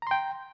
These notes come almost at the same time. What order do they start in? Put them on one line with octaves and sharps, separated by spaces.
A#5 C6 G5